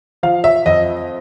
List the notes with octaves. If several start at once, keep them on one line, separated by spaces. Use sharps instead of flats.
F3 F5
E5
F2 D#5